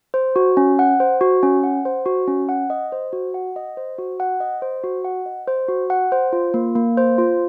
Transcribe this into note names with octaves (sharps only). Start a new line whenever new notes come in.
C5
F#4
C#4
F#5
C5
F#4
C#4
F#5
C5
F#4
C#4
F#5
D#5
C5
F#4
F#5
D#5
C5
F#4
F#5
D#5
C5
F#4
F#5
D#5
C5
F#4
F#5
C5
F4
A#3
A#3
C5
F4